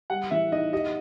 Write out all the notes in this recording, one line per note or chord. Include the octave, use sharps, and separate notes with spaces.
G3 F#5
E3 E5
D#4 D#5
G4 D#5